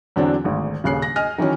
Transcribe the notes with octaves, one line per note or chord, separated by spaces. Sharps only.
E2 D3 F#3 C4 D4
G#1 D2
D#1 C#3 F#6 C7
A#6
D#5 G#5 F6 A#6
D#3 E3 F#3 C#4